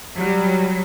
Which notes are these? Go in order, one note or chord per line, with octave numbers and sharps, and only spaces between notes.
F#3 G3